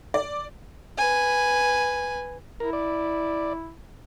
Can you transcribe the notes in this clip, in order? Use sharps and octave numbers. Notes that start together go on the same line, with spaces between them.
D5
B4 G#5
E4 A#4
D5